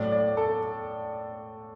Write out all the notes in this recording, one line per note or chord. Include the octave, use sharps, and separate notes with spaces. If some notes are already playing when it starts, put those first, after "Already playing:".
Already playing: A2 F#3 A3 D5
D5
A4